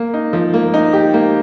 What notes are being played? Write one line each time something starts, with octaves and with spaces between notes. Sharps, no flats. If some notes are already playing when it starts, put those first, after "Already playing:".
Already playing: A#3
D#4
F3
A#3
D#4
G4
A#3